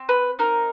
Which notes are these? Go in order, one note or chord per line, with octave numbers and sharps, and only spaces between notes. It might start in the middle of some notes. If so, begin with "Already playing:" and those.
Already playing: C4
B4
D#4 A#4